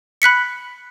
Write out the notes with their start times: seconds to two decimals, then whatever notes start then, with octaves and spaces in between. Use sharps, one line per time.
0.22 B5 F#6 B6 C#7